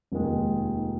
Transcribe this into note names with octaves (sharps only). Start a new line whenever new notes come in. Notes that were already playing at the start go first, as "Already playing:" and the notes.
F1 D#2 D#3 G#3